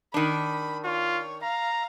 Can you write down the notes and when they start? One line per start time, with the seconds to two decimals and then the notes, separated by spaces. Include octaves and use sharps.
0.14 D#3 D4 B5
0.85 F4 C#5
1.43 F5 A#5